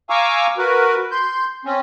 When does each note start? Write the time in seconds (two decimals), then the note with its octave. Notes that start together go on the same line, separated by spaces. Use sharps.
0.10 F5 G#5 A#5 C#6 D6 E6
0.58 F#4 A#4 B4
1.12 C6 G6
1.65 C4 C#4